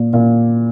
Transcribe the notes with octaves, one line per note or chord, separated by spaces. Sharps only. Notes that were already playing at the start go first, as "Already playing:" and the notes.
Already playing: A#2
A#2